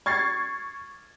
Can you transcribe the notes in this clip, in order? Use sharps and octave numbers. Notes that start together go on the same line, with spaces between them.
C#6 G#6 A6 C7